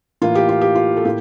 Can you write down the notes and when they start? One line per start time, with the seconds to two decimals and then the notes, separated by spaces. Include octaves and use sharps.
0.22 A2 E3 A#3 F4
0.35 G4
0.49 F4
0.61 G4
0.75 F4
0.97 A4
1.05 A2 A#3 G4